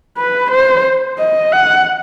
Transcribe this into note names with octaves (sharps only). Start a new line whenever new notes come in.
B4
C5
D#5
F#5